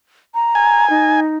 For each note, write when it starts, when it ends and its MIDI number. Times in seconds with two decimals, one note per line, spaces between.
0.34 0.88 82
0.55 1.20 80
0.90 1.37 63